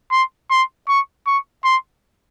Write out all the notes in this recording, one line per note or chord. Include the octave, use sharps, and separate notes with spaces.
C6
C6
C#6
C#6
C6